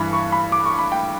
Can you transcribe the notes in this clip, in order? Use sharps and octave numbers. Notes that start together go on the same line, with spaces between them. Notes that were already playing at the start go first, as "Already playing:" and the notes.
Already playing: G2 E3 B5
C#6
B5
D6
C#6
B5
G5